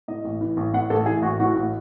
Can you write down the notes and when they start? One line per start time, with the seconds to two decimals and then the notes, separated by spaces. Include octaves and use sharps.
0.08 A2 D#5
0.25 A1
0.41 E3
0.57 A1
0.73 A2 F#5
0.90 A1 A4
1.06 E3 G#4
1.22 A1 F#4
1.39 A2 F#4
1.55 A1